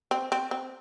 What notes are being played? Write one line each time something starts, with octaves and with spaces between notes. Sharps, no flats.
C4
C4
C4